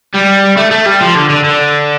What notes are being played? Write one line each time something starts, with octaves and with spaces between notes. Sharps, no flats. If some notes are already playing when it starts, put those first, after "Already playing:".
G3
A3
A3
G3
F3
D3
D3
D3